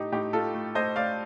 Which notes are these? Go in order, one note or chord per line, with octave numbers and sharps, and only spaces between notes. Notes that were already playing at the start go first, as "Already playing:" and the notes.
Already playing: A2 A3 D#4 G4
A2 D#4 G4
A3 F4 A4
A3
A3 C5 D#5
A3 D5 F5